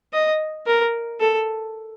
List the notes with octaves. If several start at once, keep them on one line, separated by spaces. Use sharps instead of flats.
D#5
A#4
A4